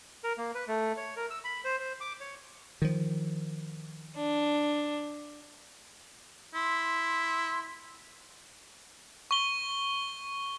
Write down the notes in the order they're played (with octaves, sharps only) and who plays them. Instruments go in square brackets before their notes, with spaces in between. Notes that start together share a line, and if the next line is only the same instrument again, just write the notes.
[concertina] A#4
A#3
B4
A3
C#5
A#4
E6
B5
C5
C5
D6
C#5
[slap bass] D#3 F3
[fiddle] D4
[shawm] E4 [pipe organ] C6
[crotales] C#6 G7